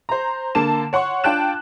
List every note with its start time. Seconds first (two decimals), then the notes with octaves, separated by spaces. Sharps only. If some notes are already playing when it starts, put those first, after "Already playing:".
0.09 C5 A#5
0.55 D3 A#3 A5 E7
0.93 C#5 F#5 C6 C#6
1.24 D4 F4 G5 A5 F#6 E7